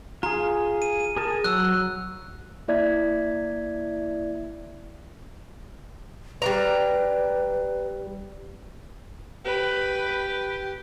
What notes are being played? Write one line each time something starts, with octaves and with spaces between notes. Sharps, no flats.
F4 G#4 A#5
D#7
G#4 A#4 A5
F#3 E6 F#6
A#3 E4 D5 E5 G#6 B6
G3 D4 B4 A#5
G4 B4